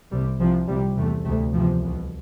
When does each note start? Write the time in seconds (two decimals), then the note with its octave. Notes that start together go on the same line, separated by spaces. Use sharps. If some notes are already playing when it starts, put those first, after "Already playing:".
0.12 C2 C3 G3
0.40 C2 C3 F3
0.69 C2 C3 G3
0.97 E2 C3 A3
1.25 C3 A3
1.29 D2
1.53 E2 C3 F3
1.82 C2 B2